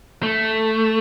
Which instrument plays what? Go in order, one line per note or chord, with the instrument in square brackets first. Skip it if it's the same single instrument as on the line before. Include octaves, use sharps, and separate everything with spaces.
[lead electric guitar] A3